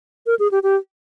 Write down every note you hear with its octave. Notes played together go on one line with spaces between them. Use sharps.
A#4
G#4
G4
G4